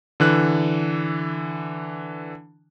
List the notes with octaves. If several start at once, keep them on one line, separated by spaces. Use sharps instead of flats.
D3 E3 F#6